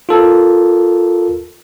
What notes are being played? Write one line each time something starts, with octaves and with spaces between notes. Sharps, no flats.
F4 A4 A#4